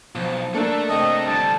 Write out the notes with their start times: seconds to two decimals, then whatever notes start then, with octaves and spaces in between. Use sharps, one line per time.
0.15 B1 F3
0.55 A3 A#3 D4 A4 E5
0.89 C3 A3 D#5
1.27 D3 G3 A5